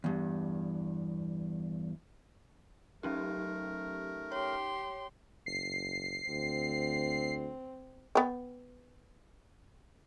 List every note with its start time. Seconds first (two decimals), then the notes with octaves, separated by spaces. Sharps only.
0.04 E2 G2
3.03 F#3 A3 C#4 D#4 G4 A#4
4.32 G4 C#5 C6
5.46 F#1 C7
6.29 D2 C4
8.15 B3 G5